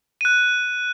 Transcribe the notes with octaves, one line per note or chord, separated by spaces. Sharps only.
F#6 D#7